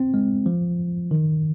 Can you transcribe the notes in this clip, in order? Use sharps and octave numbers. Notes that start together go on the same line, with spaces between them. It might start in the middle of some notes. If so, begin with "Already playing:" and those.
Already playing: C4
G#3
F3
D#3